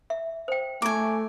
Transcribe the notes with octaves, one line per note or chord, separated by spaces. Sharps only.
E5
C5 G5
A3 E4 G#5 C#6 D6